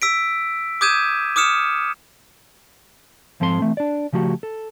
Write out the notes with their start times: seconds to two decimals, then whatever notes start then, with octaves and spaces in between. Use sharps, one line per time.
0.02 E6 B6 D7
0.81 D6 D#6 G6 G#6 D#7 E7
1.36 D6 D#6 F6 C#7 E7
3.40 G#2 F3 C4 A4 B4 C6
3.60 E3 A3 C4
3.77 D4 D5
4.13 C#3 F3 A3 F#4 G4
4.43 A4